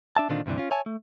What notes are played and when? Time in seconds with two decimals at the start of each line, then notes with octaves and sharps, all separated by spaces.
0.17 D4 E5 A5
0.29 A#2 D3 D#3 C4 D4 F4
0.46 D2 G2 C3 E3 D4
0.58 C#4 F4
0.71 C#5 E5 G#5 A5
0.86 A3